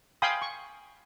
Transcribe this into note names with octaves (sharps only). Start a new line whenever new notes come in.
F5 G5 G#5 B5 C6 D#6
C#6